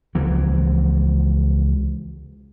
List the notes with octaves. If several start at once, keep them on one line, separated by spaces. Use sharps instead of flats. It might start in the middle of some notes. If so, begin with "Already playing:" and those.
C#2 E3 F3